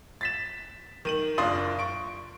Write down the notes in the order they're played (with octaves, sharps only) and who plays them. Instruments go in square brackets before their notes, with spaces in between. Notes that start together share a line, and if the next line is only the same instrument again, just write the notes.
[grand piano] A6 B6 E7
D#3 D#7 F#7
F#1 D4 F4 C6 D#6
C#6 D7